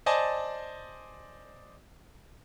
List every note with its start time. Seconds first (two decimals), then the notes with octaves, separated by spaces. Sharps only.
0.06 C5 D5 D#5 G#5 A5